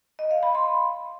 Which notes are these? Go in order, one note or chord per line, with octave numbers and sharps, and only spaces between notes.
D#5
F5
B5
C6